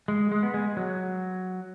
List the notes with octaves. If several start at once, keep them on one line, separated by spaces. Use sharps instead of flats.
G#3
G#3
B3
G#3
F#3